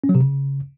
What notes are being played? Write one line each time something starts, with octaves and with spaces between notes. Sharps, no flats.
C#4
F#3
C3
C#3